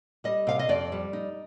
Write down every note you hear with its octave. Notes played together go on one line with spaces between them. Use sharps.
G3 D#5
C3 F5
D#5
F2 D5
G3
D#4